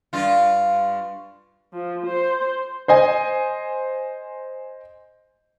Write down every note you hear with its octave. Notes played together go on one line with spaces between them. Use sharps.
G2 F4
F3
C5
C5 D#5 G#5